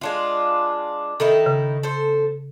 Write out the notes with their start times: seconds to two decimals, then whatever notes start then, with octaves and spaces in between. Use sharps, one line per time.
0.01 G#3 D4 F4
1.20 D#3 D#4 E4 A4
1.46 C#3
1.83 A4 C5